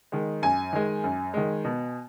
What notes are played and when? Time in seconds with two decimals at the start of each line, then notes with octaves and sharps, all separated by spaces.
0.12 D#3 G#3
0.42 F#2 G#5
0.73 D#3 G#3
1.04 F#2
1.34 D#3 G#3
1.65 B2